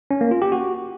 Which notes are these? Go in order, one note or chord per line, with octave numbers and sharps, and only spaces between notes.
C#4
A#3
F4
G4
F#4